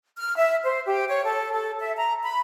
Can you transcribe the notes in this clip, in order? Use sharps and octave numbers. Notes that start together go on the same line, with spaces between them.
F6
E5
C5
G4
C#5
A4
A4
E5
A#5
B5